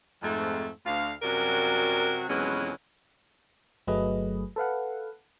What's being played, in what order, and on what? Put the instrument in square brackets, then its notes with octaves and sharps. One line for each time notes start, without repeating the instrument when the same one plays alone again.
[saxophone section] F2 G#2 A3
D2 F5
F#2 C3 F#3 G3 F#4 A#4
F2 B2 E3 F#3 G#3 C#4
[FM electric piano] G1 F#3 A3 G#4 B4 D#5
A4 B4 F5 F#5